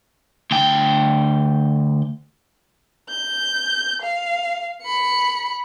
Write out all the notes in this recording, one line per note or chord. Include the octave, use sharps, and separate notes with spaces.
D2 G5
G6
F5
B5 C#7